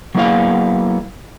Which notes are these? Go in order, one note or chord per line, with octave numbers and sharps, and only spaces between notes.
F#3 A#3 B3 E4 G#4 F5